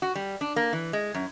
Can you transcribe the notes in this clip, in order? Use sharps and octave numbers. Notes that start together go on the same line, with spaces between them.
F#4
G3
D4
A#3
E3
G#3
F#2